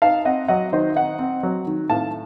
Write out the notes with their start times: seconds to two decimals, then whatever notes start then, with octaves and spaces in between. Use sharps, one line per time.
0.02 D#4 F5 A5
0.25 C4 D#5 F#5
0.48 F#3 D#5 F#5
0.73 D#3 C5 D#5
0.96 D#4 D#5 F#5
1.19 C4
1.43 F#3
1.67 D#3
1.90 A2 F5 A5